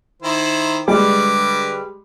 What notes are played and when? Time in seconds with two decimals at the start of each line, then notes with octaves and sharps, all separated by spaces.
0.22 D#3 E4 C5
0.88 D3 G3 G#3 B4 D6